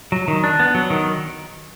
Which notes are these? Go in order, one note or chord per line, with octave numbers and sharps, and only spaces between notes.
F#3
D#3
D4
B3
F#3
D#3